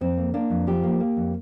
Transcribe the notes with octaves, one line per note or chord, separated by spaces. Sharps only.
F2 C4
A#3
A#3 D4
F2
F3 G4
A#3
A#3
F2